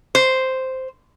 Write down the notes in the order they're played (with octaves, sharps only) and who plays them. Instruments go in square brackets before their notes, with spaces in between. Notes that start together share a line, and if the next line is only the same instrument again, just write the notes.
[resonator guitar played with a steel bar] C5